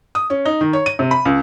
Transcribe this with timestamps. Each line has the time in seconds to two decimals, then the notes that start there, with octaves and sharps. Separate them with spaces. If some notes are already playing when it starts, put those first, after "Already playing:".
0.15 D#6
0.30 C#4
0.45 D#4
0.61 D#3
0.73 C#5
0.86 D#7
0.99 C3
1.11 B5
1.25 C#2